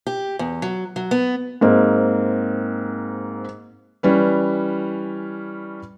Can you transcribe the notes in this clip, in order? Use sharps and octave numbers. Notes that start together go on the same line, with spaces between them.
G4
E2
F#3
F#3
B3
G#2 A#3 C4
E3 G3 C#4 B4